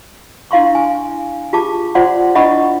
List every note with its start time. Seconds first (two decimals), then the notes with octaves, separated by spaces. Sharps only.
0.51 D4 E4 F5 C6 C#6
0.75 G#5
1.53 F4 G4 G#4 A5 D6
1.95 F4 C5 D5 F#5 C6
2.35 D4 E4 D#5 F#5 B5 C#6